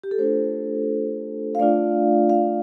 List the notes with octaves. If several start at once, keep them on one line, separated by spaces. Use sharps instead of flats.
G4
A4
A3 D4 F4 C5
F5
A3 D4 F4 D5
F5